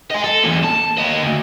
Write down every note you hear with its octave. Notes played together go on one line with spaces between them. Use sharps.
D#5 G#5
A4
E2 A#2
A5
A#3 D#5
D2